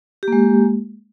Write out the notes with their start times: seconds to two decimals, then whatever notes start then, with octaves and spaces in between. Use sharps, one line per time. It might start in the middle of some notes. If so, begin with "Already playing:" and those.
0.23 G4
0.28 A#3
0.33 G#3